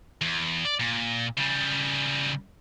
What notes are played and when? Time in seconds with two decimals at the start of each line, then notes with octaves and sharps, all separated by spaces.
0.21 E2
0.65 D5
0.80 A#2
1.38 C#3 G3